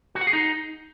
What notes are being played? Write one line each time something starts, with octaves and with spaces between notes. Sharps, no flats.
F#4
F#5
G#4
D#4